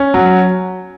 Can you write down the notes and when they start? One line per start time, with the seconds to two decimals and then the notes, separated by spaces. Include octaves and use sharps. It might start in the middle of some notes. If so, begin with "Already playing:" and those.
Already playing: C#4
0.14 F#3